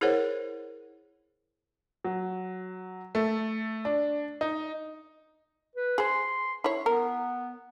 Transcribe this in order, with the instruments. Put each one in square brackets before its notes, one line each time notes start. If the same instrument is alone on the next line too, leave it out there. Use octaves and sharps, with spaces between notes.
[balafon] E4 G#4 A#4 C5 C#5 F#5
[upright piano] F#3
A3
D4
D#4
[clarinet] B4
[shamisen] G#4 C5 [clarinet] C6
[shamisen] E4 C#5
[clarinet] B3 [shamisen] A#4